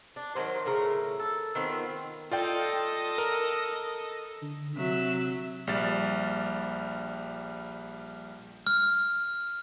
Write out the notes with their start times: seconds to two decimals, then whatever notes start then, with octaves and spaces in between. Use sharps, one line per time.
0.16 D4
0.35 D#3 F3 F#3 C5
0.65 A2 C#3 A#4 A#5
1.19 A4
1.55 D#3 B3 C4 F4
2.31 F4 A4 D5 D#5 G5
3.18 A#4
4.42 D3
4.76 C3 F#3 E5
5.67 A#1 G3 A6
8.67 F6